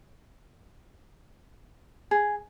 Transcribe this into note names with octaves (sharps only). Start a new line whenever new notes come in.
G#4